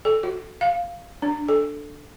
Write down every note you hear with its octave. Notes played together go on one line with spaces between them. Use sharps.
A4
F#4
F5
D4
A4